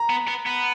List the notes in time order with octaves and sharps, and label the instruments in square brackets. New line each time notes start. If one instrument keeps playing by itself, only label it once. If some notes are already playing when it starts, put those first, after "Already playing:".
Already playing: [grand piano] A#5
[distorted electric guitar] B3
B3
B3